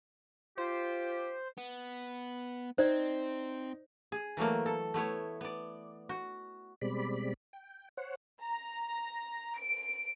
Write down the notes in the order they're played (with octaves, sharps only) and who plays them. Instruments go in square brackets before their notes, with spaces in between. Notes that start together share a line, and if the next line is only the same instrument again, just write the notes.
[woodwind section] F4 G4 [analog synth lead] C5
[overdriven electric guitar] B3
[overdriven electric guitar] C4 [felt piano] D#4 [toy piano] C5 D5
[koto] G#4
E3 F#3 A3 A#3
A4
A3 B3 E4 C#5
B3 D5
F#4
[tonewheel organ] B2 G3 G#3 C4 D5 B5
G5
C5 C#5 F#5
[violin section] A#5
D7